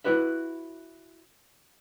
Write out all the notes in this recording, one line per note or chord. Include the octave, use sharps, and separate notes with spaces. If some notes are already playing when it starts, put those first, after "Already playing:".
E4 F#4 B4 E5